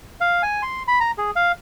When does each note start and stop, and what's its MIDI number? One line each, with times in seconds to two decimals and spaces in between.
0.21 0.42 77
0.43 0.62 80
0.63 0.83 84
0.88 0.99 83
1.00 1.11 82
1.18 1.31 68
1.36 1.52 77